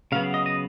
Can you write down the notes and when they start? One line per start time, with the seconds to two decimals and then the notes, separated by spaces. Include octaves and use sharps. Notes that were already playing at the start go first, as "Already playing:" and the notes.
0.12 C#3 F#3 B3 F5
0.34 D#5
0.46 D#5